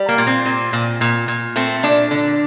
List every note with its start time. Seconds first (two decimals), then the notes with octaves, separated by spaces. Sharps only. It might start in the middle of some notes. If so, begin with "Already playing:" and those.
Already playing: G3
0.09 A#3
0.18 A#2
0.27 C4
0.46 A#2
0.73 A#2
1.01 A#2
1.28 A#2
1.56 A3 C4
1.83 A#2 D4
2.11 D3